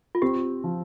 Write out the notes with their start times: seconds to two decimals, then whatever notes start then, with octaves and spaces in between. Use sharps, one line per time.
0.15 F4
0.22 C4 G4
0.64 F3